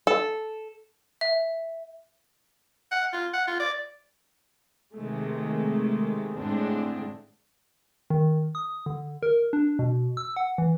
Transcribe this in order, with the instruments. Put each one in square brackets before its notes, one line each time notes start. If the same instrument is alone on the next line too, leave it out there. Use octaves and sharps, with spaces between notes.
[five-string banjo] A4
[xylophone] E5
[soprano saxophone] F#5
F4
F#5
F4
D5
[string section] C3 D#3 G#3 A3
A2 D3 G#3 C4 D4
[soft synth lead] D#3
D#6
D3
A#4
D4
B2
E6
F#5
E3